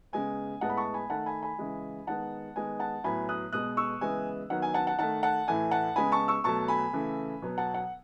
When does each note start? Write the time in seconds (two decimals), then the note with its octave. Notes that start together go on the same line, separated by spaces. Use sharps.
0.13 C#3 G#3 B3 G#5
0.61 A2 G#3 B3 F#5 A5
0.70 B5
0.77 A5 C#6
0.94 G#5 B5
1.10 D#3 A3 F#5 A5
1.26 G#5 B5
1.43 G#5 B5
1.59 C#3 E3 G#3
2.07 D#3 G#3 B3 F#5 A5
2.56 D#3 G#3 B3 G#5
2.80 F#5 A5
3.04 A2 F#3 B3 G#5 B5
3.29 D#6 F#6
3.52 B2 G#3 B3 D#6 F#6
3.77 C#6 E6
4.01 C#3 E3 G#3 B3 G#5
4.50 D#3 F#3 B3 F#5
4.62 G#5
4.74 F#5 A5
4.87 F#5 A5
4.99 D#3 A3 F#5 A5
5.23 F#5 A5
5.48 A2 E3 A3 G#5
5.71 F#5 A5
5.96 C#3 G#3 B3 G#5 B5
6.12 A5 C#6
6.28 C#6 E6
6.44 B2 F#3 A3 A5 C#6
6.68 G#5 B5
6.93 C#3 E3 A3
7.42 B2 F#3 B3
7.58 F#5 A5
7.74 F#5